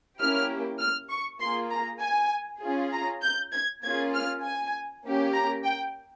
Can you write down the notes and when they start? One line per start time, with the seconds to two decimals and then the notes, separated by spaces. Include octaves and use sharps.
0.20 A#3 C#4 E4 G4 F6
0.79 F6
1.10 C#6
1.40 A#3 F4 G#4 C6
1.71 A#5
2.01 G#5
2.62 C#4 F4 G#4
2.92 A#5
3.23 G6
3.52 G#6
3.83 A#3 C#4 F4 G#4 G#6
4.14 F6
4.44 G#5
5.05 A#3 C#4 G4
5.34 A#5
5.64 G5